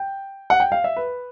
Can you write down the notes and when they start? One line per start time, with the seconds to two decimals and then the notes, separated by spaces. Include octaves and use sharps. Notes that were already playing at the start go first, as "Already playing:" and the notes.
Already playing: G5
0.50 F#5
0.60 G5
0.72 F5
0.84 E5
0.96 B4